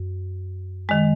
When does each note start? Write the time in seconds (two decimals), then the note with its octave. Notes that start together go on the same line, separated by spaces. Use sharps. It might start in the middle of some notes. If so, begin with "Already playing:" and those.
Already playing: F#2
0.89 D#3 G#3